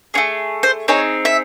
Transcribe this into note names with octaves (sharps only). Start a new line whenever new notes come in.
A3 C#4 G#4
C5
C4 D#4 G#4 C#5
E5